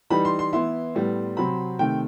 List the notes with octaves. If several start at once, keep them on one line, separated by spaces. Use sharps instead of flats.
E3 G3 D#4 B5
C6
C6
E3 B3 E4 C6
A2 G3 B3
C3 F#3 C4 B5
C3 D#3 A3 G5